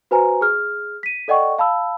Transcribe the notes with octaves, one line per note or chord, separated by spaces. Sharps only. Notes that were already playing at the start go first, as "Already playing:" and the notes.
F#4 B4 C5 G#5 A#5
G#4 F6
B6 D#7
A4 D5 D#5 F#5 G5 C#6
F5 A5 B5 E6